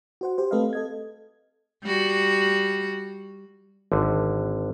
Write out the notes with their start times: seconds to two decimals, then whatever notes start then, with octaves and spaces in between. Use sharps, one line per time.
0.21 F#4 C5 F#5
0.38 G4 C5
0.51 A3 C4 A4 B4 D#5 F5
0.73 A4 D#5 G#6
1.84 G3 F#4
3.92 G#1 D3